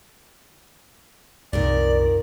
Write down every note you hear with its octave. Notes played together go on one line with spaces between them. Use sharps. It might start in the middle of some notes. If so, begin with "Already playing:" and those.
C2 F#2 A#2 D#3 A#4 D5